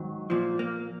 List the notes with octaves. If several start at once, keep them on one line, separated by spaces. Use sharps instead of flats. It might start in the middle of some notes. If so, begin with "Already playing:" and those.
Already playing: G#2 D#3 F#3
A#2 F3
A#3